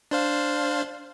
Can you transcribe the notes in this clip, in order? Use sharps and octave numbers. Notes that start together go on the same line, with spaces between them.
D4 C5 F5